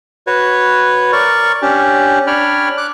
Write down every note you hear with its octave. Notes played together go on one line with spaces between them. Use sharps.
F#4 B4 C#5
A#4 D5 C#6
C#4 D4 G4
D4 C#5 G5 B5 F6
D6 F#6